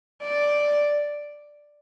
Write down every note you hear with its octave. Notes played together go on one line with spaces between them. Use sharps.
D5